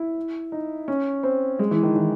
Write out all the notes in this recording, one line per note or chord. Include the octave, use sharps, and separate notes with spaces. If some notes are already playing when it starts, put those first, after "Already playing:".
Already playing: E4
D#4
C#4
C4
G#3
E3
D#3
E3